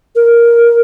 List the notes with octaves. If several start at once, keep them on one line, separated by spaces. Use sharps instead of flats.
A#4